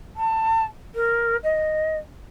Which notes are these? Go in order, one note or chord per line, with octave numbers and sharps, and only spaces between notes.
A5
A#4
D#5